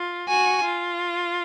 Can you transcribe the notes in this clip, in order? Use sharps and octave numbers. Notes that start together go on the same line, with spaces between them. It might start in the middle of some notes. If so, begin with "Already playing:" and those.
Already playing: F4
F#4 G#5
F4